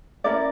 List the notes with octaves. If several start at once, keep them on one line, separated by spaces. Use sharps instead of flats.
C#4 E4 A#4 D5